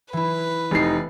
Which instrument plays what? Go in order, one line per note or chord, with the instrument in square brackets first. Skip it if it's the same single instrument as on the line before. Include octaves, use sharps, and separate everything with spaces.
[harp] E3 E4 [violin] B4
[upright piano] F1 C7 [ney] D#4